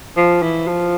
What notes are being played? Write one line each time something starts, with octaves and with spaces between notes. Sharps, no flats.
F3
E3
F3